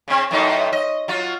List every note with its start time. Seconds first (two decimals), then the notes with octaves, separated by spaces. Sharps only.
0.08 C#3 C4
0.31 F#2 A2 D#4
0.73 D#5
1.08 F#3 F4